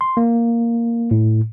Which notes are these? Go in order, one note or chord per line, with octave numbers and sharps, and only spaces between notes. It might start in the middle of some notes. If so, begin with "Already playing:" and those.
C6
A#3
A2